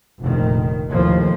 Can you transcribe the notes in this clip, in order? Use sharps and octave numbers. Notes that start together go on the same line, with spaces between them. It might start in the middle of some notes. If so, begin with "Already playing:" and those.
F1 A#1 D#3
D#2 A2 F3